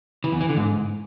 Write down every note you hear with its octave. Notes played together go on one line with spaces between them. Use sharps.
E3
E2
E3
D3
G#2